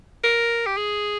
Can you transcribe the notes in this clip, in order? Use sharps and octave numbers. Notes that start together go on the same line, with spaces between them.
A#4
G4
G#4